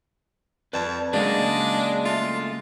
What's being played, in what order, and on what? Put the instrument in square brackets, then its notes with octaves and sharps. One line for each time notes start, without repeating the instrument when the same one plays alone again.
[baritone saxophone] F2 [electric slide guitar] B4 D5 A5
[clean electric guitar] C#3 F#3 A#3 [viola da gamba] G#3 [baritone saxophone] D4 [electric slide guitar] G#4 D5 F5
[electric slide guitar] A3 [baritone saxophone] F4